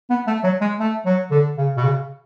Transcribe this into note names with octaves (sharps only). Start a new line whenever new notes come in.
B3
A3
F#3
G#3
A3
F#3
D3
C#3
B2
C#3